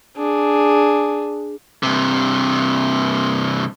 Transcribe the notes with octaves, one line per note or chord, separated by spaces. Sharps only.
D4 G#4
G2 C3